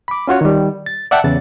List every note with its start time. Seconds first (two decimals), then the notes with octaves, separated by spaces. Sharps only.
0.08 B5 D6
0.28 C#4 F4 F#4 C#5
0.41 D#3 G3
0.86 A6
1.11 D5 E5 F#5 G5 A5
1.24 E2 C#3 A6